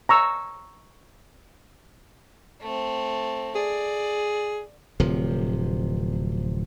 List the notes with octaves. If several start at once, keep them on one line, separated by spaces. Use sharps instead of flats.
A#5 C#6 E6
A3 C4
G#4 D5
D1 C3 F3